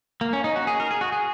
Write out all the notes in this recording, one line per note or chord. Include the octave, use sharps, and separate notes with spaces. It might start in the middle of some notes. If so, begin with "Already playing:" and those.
A#3
C#4
D#4
F#4
G#4
A#4
G#4
F#4
G#4